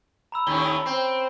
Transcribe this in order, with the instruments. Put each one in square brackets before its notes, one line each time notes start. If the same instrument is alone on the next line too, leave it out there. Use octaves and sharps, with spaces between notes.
[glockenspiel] A#5 B5 E6
[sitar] D#2 A2 C#4 [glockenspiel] G7
[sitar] C4